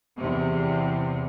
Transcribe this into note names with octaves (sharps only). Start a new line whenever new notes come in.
E2 C3